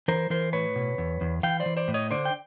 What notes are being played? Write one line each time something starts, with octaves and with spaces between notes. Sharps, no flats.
E3 A#4 C5
E3 A#4 C5
A2 B4 C#5
B2
E2
E2
E3 F5 G5
C5 D5
E3
C5 D5
A2
C#5 D#5
D3 C5 D5
G5